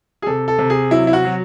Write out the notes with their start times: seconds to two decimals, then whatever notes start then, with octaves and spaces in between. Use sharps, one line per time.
0.22 G#4
0.26 C3 A4
0.48 A4
0.58 C3
0.70 G#4
0.91 F#3 E4
1.07 E4
1.13 F#4
1.25 F#3